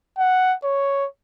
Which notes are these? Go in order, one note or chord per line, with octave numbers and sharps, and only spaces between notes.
F#5
C#5